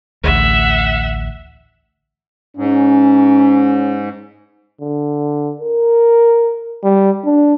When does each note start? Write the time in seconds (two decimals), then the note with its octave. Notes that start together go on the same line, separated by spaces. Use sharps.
0.24 A1 D2 E5 F#5
2.57 G#2 C#4
4.81 D3
5.60 A#4
6.83 G3
7.25 D4